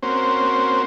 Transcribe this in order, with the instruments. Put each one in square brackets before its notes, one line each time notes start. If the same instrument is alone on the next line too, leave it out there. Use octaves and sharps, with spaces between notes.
[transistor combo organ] A#3 C4 C#4 F#4 C5